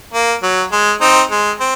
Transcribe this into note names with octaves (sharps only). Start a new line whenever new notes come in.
A#3
F#3
G#3
C4 D#4
G#3
C4